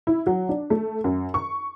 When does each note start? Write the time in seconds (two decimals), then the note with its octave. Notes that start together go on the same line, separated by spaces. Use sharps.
0.07 E4
0.27 F#3
0.49 D4
0.70 A3
1.04 F#2
1.34 C#6